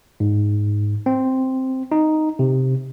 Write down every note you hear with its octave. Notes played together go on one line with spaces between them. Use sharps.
G#2
C4
D#4
C3